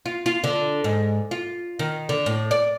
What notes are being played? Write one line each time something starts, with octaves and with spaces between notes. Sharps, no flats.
F4
F4
D3
G#2
F4
D#3
D3
A2
D5